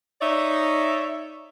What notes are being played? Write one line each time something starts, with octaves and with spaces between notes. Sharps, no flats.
D#4 C#5 D5 E5